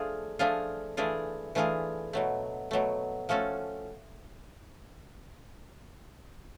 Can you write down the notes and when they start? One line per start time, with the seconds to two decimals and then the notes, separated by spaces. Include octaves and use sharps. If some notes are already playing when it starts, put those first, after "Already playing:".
Already playing: F3 A3 D4 F4 G#4
0.39 F3 A3 D4 F4 G#4
0.97 E3 A3 D4 F4 G#4
1.55 E3 A3 D4 F4 G#4
2.13 B2 F#3 A3
2.71 B2 F#3 A3
3.29 F3 A3 C#4 F#4 A4